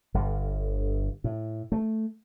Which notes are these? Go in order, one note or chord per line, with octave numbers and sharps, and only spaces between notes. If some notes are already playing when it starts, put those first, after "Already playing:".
G1 G2 D3
A2
A3